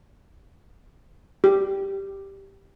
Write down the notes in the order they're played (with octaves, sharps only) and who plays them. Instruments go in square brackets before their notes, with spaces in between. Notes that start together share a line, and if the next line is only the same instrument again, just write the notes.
[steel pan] G4